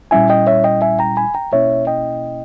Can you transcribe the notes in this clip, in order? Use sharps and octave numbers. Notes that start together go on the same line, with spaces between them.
A#2 G3 C#4 E4 E5 G#5
D#5 G5
C#5 E5
D#5 G5
E5 G#5
G5 A#5
G#5 B5
G5 A#5
B2 A#3 C#4 E4 C#5 E5
D#5 G5